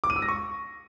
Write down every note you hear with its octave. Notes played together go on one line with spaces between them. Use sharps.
D6
D#7
E6
A#6
C#6